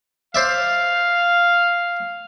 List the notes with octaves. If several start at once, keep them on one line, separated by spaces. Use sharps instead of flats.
C5 D5 E5 F5